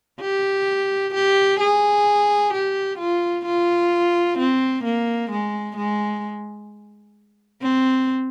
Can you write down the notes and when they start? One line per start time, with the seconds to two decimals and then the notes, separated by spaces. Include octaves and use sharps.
0.21 G4
1.14 G4
1.60 G#4
2.53 G4
2.99 F4
3.45 F4
4.38 C4
4.84 A#3
5.31 G#3
5.77 G#3
7.62 C4